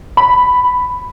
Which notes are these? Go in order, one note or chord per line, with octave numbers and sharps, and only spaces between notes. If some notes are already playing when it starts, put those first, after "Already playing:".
B5